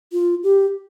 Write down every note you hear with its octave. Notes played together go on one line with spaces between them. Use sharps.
F4
G4